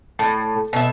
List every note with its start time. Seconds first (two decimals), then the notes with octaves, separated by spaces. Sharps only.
0.19 A2
0.73 B2 E5